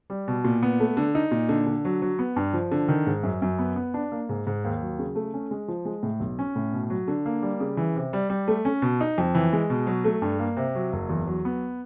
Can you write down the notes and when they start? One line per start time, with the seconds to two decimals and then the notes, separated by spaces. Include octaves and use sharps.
0.10 G3
0.28 B2
0.44 A#2
0.63 B3
0.80 A3
0.97 D3
1.15 D#4
1.31 A#2
1.49 D3
1.67 D3
1.85 F#3
2.02 F#3
2.19 B3
2.36 G2
2.53 F3
2.71 D3
2.88 D#3
3.07 G#2
3.23 F#2
3.42 F#2
3.59 B3
3.76 B3
3.94 D4
4.12 A#3
4.29 G#2
4.47 G#2
4.64 D#2
4.81 F#3
4.99 C#3
5.16 A3
5.34 C#4
5.51 G#3
5.68 F3
5.85 G#3
6.03 A2
6.20 B1
6.39 C#4
6.56 A2
6.73 B2
6.90 F#3
7.08 D3
7.26 A#3
7.43 G3
7.60 C#3
7.77 E3
7.96 C3
8.13 G3
8.30 G3
8.48 A3
8.65 C#4
8.82 B2
9.01 D#4
9.18 F2
9.35 E3
9.53 G#3
9.70 B2
9.87 F#3
10.04 A3
10.22 G2
10.39 A#3
10.57 C3
10.75 F#3
10.93 F#1
11.09 E2
11.27 F#3
11.45 B3